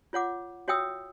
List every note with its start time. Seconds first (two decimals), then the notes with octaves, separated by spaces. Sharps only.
0.13 F4 C#5 F#5 D6
0.68 F#4 C#5 E5 G5 D#6 E6